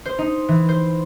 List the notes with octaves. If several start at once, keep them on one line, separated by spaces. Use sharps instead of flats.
C5
D#4
E3
C5